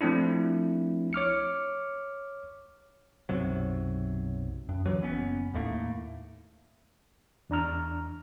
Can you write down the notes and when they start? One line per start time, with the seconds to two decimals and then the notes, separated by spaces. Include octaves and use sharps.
0.01 F3 A3 C4 D4 E4
1.13 C#5 D6 F6 C#7
3.29 B1 F#2 C3 F#3
4.69 F#2
4.86 D1 E3 F#3
5.02 F#1 B3 C#4
5.54 D#2 A2 A3 A#3
7.50 E2 D4 A#5 F6